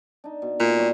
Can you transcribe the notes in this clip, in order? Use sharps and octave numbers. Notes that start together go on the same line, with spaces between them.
D4 D#4
B2
A#2 D3
G3 C#5